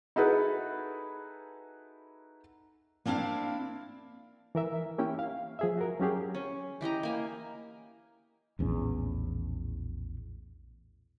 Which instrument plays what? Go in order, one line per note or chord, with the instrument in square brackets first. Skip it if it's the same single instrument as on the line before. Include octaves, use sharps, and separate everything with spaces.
[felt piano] D#4 E4 F#4 G#4 A4 B4
[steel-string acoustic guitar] A#3 C4 D4 E4 F5
[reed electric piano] E3 A#4 E5
A#3 C#4 E4 G4 G5
F5
F3 G#4 E5
F#4 A#4
F#3 C#4 G4 G#4
[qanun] C#4
E3 G4 D#5 A#5
A#3 G#5
[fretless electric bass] A#1 E2 A2 C#4